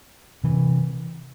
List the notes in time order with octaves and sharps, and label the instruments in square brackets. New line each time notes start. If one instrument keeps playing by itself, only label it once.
[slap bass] C3 E3